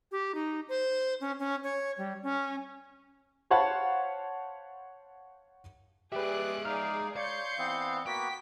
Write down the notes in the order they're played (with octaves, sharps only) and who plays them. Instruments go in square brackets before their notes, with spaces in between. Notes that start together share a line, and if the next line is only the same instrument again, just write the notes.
[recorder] G4
D#4
C5
C#4
C#4
C#5
G3
C#4
[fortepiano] C5 C#5 F5 F#5 A5 B5
[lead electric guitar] G#3 E5 [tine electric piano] G4 B4 [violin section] G#4 D5 F#6
[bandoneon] D#4 [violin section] G#4 D5 F5 [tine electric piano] F6
[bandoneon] C#5 [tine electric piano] D5 [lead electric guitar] F5 [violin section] C6 G6 C#7
[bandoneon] E3 B3 C4
[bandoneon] A#3 B3 F#4 [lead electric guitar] G5 [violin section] B6